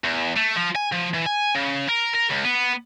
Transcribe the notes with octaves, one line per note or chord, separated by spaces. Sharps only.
E2
A3
F3
G#5
F3
E3
G#5
C#3
A#4
A#4
C#2
B3